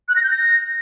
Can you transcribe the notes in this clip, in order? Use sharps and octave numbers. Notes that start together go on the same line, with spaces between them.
F#6
A#6
G6
A#6